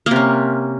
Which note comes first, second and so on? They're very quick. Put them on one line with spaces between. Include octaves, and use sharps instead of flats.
A#3 C3 C#4